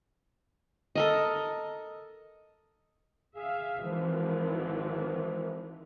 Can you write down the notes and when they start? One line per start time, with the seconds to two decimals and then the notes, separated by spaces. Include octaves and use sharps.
0.95 A4 A#4 D#5
3.36 G#4 E5 F5
3.84 G#1 E3 F3